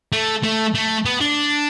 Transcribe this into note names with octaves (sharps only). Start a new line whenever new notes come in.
A3
A3
A3
B3
D4